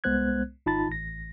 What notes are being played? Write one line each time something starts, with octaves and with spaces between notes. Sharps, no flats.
C2 G#3 B3 C5 F#6 G#6
G#1 D#4 F4 A5 B5 A6
A1 A#6